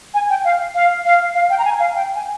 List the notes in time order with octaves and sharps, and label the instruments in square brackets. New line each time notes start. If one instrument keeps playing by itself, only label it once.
[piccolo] G#5
G5
F5
F5
F5
F5
G5
A#5
G#5
F5
G5
G#5